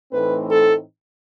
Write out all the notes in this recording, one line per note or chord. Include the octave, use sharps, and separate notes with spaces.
A2 E3 A3 C4 D#4 B4
A4